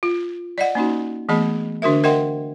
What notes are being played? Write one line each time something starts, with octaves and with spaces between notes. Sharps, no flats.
F4
D5 D#5 F#5
A#3 C#4 D#4 F#4
E3 A3 B3 G#4 D#5 B5
D3 D4 F#4 A#4 E5
A#4 D#5 E5 F#5 G5 C6